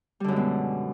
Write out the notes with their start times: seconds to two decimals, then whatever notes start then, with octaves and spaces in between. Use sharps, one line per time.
0.20 G3
0.24 D3
0.28 F#2
0.32 G#3
0.36 B2